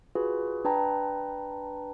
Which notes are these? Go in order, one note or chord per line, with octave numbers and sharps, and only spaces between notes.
F4 F#4 G#4 B4
D4 B4 G5 A5 A#5